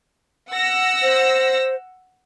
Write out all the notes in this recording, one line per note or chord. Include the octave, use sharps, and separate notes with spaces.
F#5 E6 A#6
C5